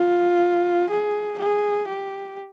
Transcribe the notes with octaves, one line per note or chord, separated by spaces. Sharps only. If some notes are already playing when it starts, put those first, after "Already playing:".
Already playing: F4
G#4
G#4
G4